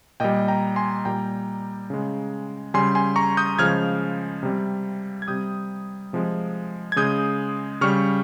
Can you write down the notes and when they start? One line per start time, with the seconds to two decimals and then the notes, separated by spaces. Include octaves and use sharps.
0.20 A#2 G3 D#5 G5
0.48 G5 A#5
0.76 G#5 C6
1.05 A#2 G3 G5 A#5
1.90 C#3 G#3
2.74 C#3 G3 G#5 C6
2.95 G#5 C6
3.16 A#5 C#6
3.37 D#6 G6
3.59 C#3 F3 G#3 F6 G#6
4.43 C3 G3
5.22 G#6
5.28 C3 G3 D#6 G6
6.13 C3 F3 G#3
6.92 G#6
6.96 C#3 G#3 D#6 G6
7.81 C#3 G3 C#6 F6